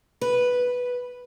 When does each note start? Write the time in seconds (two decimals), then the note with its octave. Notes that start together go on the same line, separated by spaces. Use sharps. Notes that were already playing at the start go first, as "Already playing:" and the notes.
0.21 B4